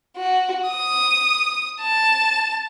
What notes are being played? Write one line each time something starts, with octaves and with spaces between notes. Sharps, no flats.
F#4
D#6
A5